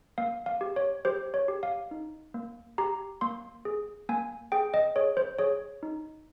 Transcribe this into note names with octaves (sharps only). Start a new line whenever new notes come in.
A#3 F5
F5
G4
C#5
G4 C5
C#5
G4
F5
D#4
A#3
G4 A#5
A#3 C6
G#4
A#3 G#5
G#4 G5
D#5
G#4 C#5
C5
G#4 C#5
D#4